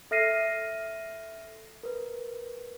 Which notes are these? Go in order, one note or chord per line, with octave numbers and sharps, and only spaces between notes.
A4 E5 F6 A#6 C7 D#7
A#4 B4